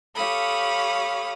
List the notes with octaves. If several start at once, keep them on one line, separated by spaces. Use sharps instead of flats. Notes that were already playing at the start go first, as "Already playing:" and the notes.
G4 A4 C#5 F5 B5 D#6